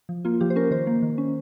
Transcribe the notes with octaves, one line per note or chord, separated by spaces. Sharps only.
F3
A#3 F4
F3 G4
C5
C#4 A#4
D#3 C5
A#3
D#3
C#4